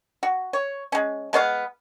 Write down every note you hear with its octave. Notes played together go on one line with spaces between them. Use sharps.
F#4
C#5
G#3 C#4
G#3 B3 C#5 F5